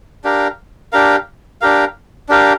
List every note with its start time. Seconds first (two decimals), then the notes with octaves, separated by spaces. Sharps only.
0.24 D4 G4 A#4 F5
0.92 D4 G4 A#4 F5
1.61 D4 G4 A#4 F5
2.29 D4 G4 A#4 F5